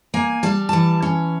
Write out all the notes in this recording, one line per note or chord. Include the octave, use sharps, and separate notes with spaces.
A#3 G#5
G3 A5
E3 A5
C#4